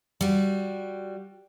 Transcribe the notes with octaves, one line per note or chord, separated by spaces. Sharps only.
G3 F#4